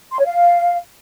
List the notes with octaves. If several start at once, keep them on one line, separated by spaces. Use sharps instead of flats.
C6
C#5
F5